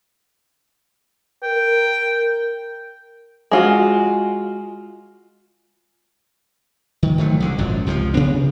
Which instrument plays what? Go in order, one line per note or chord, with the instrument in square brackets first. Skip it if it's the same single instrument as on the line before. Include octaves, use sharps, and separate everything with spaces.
[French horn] A#4 [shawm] G5
[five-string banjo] G#3 F4 F#4
[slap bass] D#3
D#3 F3 F#3 A3
C2 D3
G#1 F#2 A#2 F#3
C#2 C3 E3 F3
C3 B3 D4